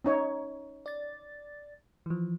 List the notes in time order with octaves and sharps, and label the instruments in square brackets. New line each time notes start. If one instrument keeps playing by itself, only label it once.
[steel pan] C#4 D#4 C#5
[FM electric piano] D5 A6
E3 F3